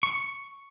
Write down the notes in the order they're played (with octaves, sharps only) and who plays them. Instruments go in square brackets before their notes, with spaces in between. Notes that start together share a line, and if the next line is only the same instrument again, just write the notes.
[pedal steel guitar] C#6